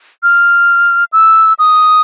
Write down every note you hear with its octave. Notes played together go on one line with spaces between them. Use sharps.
F6
E6
D#6